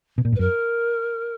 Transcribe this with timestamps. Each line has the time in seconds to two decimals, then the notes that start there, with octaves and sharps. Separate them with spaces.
0.18 B2
0.25 A#2
0.32 G#2
0.35 B4
0.39 F#2 A#4